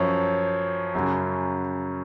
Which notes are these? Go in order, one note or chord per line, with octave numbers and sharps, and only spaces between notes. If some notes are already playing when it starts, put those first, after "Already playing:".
Already playing: F#2 F3 C#5
F#2 C#3 F#3